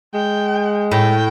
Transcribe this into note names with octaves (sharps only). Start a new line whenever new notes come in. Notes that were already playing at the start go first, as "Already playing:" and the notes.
G#3 G5
A2 G5